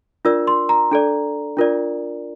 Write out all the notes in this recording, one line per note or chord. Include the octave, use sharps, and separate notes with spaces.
D4 F4 A#4 D5 E6
C6
A#5
D4 A4 D5
D4 F4 A#4 D5